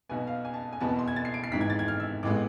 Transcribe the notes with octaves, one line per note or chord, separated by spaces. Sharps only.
B1 B2 B3 G#5
F5
G#5
A5
G#5
E1 E2 B2 B3 A5
C6
G#6
A6
C7
D7
C7
G#1 G#2 E3 B6
G#6
A6
G#6
F6
E6
A1 A2 G#3 B3 D6